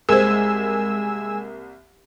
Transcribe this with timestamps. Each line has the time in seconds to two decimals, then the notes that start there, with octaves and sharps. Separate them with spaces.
0.09 C2 G#3 A#3 G#4 C5 G#5 E6